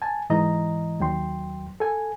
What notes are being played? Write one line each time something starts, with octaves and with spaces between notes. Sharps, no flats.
G#5 A5
G#2 E3 D#5 A#5
D#2 F#3 G5 C6
A4 G#5